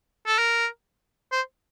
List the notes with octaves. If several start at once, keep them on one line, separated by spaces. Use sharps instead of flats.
A4
A#4
C5